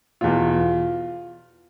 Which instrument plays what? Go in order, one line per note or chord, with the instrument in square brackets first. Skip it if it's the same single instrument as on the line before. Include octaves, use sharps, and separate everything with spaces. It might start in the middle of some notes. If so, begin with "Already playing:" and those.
[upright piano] E2 B2 F4